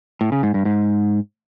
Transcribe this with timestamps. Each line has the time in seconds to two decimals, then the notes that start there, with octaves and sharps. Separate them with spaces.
0.21 A2
0.32 C#3
0.43 G#2
0.54 G2
0.65 G#2